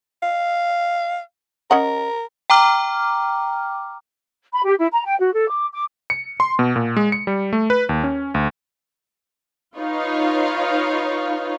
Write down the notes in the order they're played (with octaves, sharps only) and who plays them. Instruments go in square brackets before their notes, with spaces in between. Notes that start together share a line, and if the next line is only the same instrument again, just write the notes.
[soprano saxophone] F5
[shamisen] C#4 D#5 F#5 [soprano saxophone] A#4
[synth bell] G5 A#5 D6 F6
[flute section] B5
G4
E4
A#5
G5
F#4
A4
D6
D6
[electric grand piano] C#7
C6
B2
A#2
G#3
C#7
G3
A3
B4
D#2
C#4
D2
[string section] D#4 F4 B4 C#5 F5